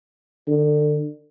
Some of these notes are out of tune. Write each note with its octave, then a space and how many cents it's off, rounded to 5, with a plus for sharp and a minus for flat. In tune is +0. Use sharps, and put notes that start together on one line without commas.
D3 +25